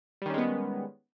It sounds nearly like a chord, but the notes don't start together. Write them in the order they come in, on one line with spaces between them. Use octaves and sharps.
G3 D#3 C#4 G#3 B3